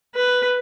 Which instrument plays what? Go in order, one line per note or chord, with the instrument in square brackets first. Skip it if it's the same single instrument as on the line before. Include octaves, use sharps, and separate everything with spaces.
[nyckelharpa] B4